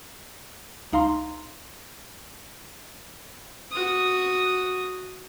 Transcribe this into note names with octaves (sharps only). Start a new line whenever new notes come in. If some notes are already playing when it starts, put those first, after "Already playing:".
C#2 D#4 F5 A#5 C6
F#4 D#6